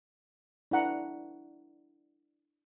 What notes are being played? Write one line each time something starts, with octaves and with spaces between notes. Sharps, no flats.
D4 E4 F#5 A#5